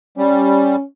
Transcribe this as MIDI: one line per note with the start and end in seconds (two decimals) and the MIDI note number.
0.18 0.76 55
0.18 0.83 61